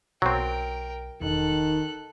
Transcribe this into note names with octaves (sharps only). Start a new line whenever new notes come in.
B1 F#3 C4 A#4 G5
E1 D#3 A4 F#6